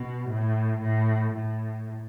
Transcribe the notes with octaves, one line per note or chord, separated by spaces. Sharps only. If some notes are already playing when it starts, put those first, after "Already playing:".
Already playing: B2
A2
A2
A2